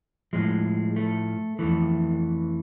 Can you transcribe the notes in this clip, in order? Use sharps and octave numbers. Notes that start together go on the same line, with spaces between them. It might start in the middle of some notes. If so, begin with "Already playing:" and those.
A2 F3 G#3
A3
F2 E3 A3